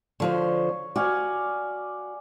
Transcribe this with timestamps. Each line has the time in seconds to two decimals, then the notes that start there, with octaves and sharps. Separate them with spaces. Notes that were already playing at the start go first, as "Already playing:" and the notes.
0.20 D3 F3 C5 C#5
0.96 F#4 D5 F5 G#5